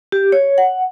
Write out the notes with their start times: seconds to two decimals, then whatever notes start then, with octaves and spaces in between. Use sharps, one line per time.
0.12 G4
0.32 C#5
0.58 F#5